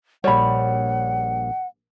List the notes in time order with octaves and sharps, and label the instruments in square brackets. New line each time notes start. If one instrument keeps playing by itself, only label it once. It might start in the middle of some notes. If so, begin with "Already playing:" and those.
[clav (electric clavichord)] A#1 G3 [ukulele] C#5 B5 [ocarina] F#5